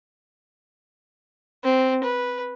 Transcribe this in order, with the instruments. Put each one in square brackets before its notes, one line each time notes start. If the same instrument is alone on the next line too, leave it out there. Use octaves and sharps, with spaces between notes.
[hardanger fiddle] C4
B4